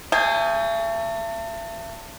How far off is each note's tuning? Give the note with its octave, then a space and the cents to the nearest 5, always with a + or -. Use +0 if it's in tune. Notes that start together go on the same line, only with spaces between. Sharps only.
A3 +35 G#4 +0 G5 +45